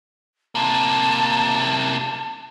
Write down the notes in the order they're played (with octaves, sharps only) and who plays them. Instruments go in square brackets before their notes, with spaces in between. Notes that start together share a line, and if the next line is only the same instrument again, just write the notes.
[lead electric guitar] C3 A#3 [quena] A5